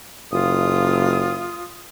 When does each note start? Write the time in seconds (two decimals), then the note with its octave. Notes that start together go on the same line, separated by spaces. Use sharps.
0.31 F#1 F4 D#6